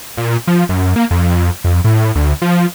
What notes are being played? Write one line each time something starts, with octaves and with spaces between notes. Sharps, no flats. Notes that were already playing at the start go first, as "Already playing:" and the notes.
A#2
F3
F#2
A#3
F2
F2
A2
D2
F3